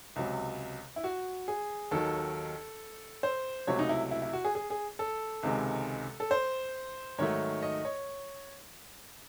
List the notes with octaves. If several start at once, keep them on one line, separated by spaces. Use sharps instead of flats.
C#2 C3 F#3
E4
F#4
G#4
D#2 D#3 F#3 A4
C5
C#2 C3 F#3 A3 C#5
D#4
E4
E4
E4
F#4
G#4
G#4
G#4
A4
C#2 C3 D#3 G#3
A4
C5
G#2 D#3 F#3 A3 C#5
D#5
C#5